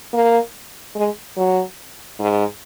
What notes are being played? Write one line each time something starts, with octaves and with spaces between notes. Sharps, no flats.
A#3
G#3
F#3
G#2